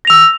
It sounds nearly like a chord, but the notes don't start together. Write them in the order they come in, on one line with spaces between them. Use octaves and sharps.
A#6 F7 E6